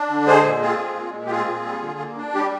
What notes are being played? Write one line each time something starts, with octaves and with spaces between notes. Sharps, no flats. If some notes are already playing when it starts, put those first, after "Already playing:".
Already playing: D4
D3
G#3 G#4 C5
A#2
C4 F4 G#4
A#2
G#3
A#2
G4
C4 F4 G#4
A#2
G3
D3
A#3
D4
G3 G4